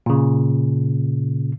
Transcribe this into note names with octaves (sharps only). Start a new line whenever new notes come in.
A#2 C#3